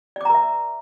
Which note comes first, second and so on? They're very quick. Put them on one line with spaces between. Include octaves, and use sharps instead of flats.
D5 D6 A#5 A#4 E5